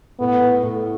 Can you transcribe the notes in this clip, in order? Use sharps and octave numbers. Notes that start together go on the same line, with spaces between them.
A2 B3
A3
A2